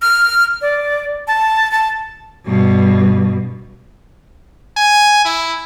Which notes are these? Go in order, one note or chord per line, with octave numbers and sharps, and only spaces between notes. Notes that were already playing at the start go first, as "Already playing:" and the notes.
F6
D5
A5
A5
G2 B2
G#5
E4